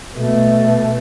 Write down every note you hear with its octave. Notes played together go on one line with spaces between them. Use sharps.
B2 A3